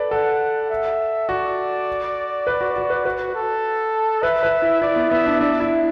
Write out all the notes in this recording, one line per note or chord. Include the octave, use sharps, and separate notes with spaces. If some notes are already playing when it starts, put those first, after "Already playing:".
Already playing: A4 B4 D5
A4 F#5
E5
F#4 D5
B4
F#4
F#4
B4
F#4 B4
A4
B4 E5
B4
E4
E4 D5
B3
B3 E5
D4
D4 E5
E4